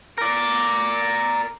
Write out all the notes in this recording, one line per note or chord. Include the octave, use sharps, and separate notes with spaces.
A#4 D5